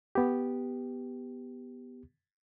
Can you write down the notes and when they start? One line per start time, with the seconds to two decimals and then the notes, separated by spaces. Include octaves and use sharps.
0.15 B3 G4